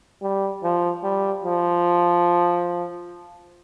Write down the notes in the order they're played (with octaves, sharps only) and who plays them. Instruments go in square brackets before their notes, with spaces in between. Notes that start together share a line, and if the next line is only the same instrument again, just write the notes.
[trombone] G3
F3
G3
F3